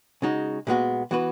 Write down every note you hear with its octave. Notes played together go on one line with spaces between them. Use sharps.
C#3 G#3 D#4 F#4
A#2 G#3 B3 F#4
E3 B3 F#4 B4